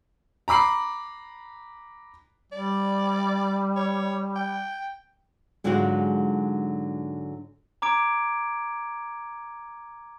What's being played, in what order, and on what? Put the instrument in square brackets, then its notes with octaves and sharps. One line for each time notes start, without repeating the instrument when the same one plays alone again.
[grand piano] A#5 B5 D6 C7 F#7
[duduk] G3 [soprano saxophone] D5
[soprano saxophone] C#5
G5
[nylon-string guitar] G#2 D3 F#3 G#3 F4 F#4
[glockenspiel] A#5 D6 G#6 D7